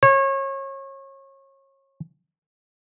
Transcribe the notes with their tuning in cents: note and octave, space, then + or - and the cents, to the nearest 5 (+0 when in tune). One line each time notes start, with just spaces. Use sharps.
C#5 -30